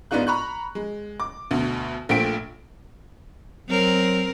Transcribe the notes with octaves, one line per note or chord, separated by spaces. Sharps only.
G#2 B3 D4 D#4 F4 F#6
A#5 B5 C#6 F#6
G#3
D6
D2 B2
A#1 A#2 A3 G5 B6 D7
F#3 C4 A#4